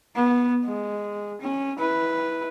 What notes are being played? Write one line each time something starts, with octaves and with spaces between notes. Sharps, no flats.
B3
G#3
C#4
E4 B4